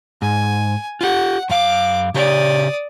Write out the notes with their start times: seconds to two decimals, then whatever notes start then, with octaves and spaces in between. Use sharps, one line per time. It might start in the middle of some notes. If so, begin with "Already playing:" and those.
0.22 G#2 G#5
1.01 F4 G4 F#5
1.50 F#2 F5 D6
2.14 C#3 G4 C#5 D5 D#6